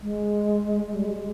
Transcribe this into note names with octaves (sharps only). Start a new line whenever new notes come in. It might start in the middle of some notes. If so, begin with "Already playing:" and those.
G#3
G3
G#3